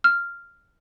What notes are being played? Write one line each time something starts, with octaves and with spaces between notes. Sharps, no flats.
F6